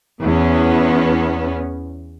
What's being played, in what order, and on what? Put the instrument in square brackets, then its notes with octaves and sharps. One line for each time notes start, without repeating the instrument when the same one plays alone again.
[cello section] E2 B3 C#4